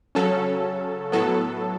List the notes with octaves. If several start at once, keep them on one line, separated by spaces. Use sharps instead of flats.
C#3 F#3 C#4 A4
A2 F#3 B3 A4